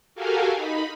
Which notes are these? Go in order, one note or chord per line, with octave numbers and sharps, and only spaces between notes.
F#4 G4 A4 A#4 F5 G#5
D#4 B5